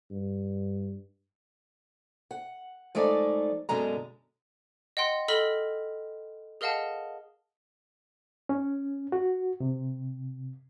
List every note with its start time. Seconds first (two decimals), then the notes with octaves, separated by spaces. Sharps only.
0.11 G2
2.31 F#5
2.95 F3 G#3 A3 D#4 D5
3.69 F#2 B2 D3 G#3 A#5
4.97 D#5 F#5 G5 C6
5.28 A4 D#5 B5 F6 B6 G7
6.61 G#4 A#4 D#5 F5 F#5 A5
8.49 C#4
9.12 F#4
9.60 C3